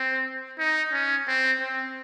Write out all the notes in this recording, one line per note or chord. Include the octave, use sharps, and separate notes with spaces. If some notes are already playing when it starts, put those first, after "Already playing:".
Already playing: C4
D#4
C#4
C4
C4